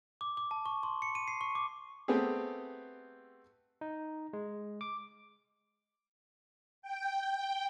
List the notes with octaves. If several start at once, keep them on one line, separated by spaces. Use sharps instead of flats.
D6
D6
A5
C#6
C6
C#7
D#7
C7
C#6
D6
A3 B3 C4 G4 G#4
D#4
G#3
D6
G5